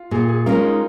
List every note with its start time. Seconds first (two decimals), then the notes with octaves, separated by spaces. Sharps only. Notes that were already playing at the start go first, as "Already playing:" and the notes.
Already playing: F4
0.11 A#2 G#4
0.28 G#4
0.46 G#3 C#4 F4 A#4
0.63 D#4